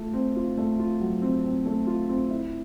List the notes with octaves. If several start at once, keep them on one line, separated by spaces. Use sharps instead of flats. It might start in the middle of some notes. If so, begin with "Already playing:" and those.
Already playing: A3 F4
C4
F4
A3
F4
F#3
C4
C4
A3
F4
C4
E4